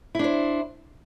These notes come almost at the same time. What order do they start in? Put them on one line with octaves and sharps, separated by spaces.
E4 D4 C5